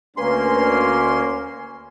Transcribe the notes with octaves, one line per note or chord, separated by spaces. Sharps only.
D2 A#3 C#4 B4 G#5 C6